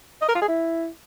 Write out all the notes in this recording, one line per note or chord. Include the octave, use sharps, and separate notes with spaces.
D#5
A#4
F4
G#4
E4